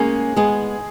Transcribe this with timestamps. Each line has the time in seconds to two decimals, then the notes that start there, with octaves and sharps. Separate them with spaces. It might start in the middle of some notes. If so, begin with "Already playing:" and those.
Already playing: G#3 A#3 C#4 G#4
0.36 G#3 B3 G#4